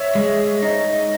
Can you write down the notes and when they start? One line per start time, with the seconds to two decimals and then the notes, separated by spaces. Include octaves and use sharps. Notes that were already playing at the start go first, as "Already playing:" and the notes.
Already playing: C#5 E5
0.15 G#3
0.62 D#4